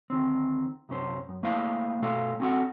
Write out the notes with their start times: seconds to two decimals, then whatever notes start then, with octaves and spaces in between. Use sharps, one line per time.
0.10 D2 D#3 C4
0.89 C2 F#2 C#4 C5
1.29 F#2
1.43 A3 A#3 E4 C5 F5
2.02 B2 A3 A4 F5
2.40 C4 C#4 F#4 A4 F#5